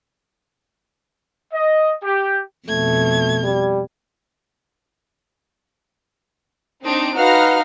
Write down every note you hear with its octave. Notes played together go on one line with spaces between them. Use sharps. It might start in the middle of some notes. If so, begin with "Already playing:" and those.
D#5
G4
F2 B2 A3 G#6
G3
C4 D4 D#4 C6 D7
D#4 F#4 B4 F5 F#5 F6 A#6